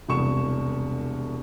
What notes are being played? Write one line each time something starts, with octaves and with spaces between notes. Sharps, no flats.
E1 C2 C#6 E7